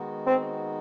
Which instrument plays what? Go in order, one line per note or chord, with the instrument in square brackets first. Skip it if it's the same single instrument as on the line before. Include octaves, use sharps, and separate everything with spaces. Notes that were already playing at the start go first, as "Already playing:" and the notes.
Already playing: [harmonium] D#3 G#3 B3 D#4 F#4
[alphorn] C4